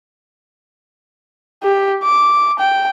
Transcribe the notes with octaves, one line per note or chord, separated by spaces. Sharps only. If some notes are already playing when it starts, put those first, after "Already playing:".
G4
D6
G5